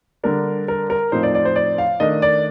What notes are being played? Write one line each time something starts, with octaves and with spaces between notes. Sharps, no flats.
D3 G3 D4 A#4
A#4
A#4
A2 F3 C4 D#4 C5
D5
D5
C5
D5
F5
D#3 A3 D4 D#5
D5